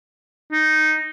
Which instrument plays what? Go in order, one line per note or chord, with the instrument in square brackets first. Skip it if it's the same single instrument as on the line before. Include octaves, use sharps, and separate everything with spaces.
[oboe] D#4